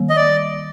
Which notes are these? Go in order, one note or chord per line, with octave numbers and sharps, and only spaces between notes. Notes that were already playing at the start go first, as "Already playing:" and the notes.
Already playing: D#3 G3 A#3
D#5
D5